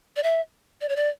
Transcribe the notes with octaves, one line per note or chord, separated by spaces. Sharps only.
D5
E5
D5
C#5
D5